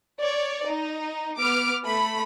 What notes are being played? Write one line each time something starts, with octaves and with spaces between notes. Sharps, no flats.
C#5 D5
D#4
B3 D6 F6 D7
A3 B5